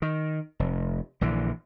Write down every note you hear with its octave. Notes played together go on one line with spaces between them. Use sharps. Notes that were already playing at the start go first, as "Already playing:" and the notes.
D#3
F1
A#1 D3 E3